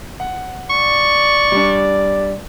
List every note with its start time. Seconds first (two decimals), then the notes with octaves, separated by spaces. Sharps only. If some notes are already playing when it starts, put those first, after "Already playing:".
0.20 F#5
0.70 D5 C#6
1.52 G3 D4